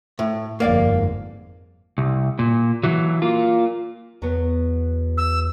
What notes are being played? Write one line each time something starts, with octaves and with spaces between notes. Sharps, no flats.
A2
G1 F2 G#2 A#3 C#5 D5 F5
C2
A#2
E3 F#3
A#3 F4
E2 F#3 B3
E6